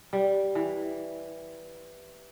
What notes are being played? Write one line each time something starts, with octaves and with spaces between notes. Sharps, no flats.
G3
E3